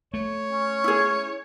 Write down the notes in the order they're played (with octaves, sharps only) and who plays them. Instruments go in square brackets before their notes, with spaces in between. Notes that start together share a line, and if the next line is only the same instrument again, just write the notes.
[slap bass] A3 [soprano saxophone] C#5
[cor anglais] C#4
[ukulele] E4 G#4